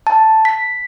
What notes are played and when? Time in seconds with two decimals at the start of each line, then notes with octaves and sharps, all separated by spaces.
0.07 A5
0.45 B6